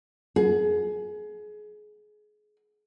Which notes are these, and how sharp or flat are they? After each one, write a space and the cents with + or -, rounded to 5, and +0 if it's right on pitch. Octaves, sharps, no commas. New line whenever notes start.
G#4 +25